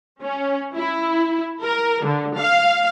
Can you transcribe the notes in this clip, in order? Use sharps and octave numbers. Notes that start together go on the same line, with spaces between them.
C#4
E4
A#4
D3
F5